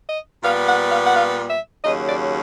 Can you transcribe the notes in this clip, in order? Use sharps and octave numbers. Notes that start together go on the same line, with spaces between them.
D#5
A#2 G3 B3 F5
F#5
F5
F#5
F5
E5
D#2 C#3 F#3 D#5
D5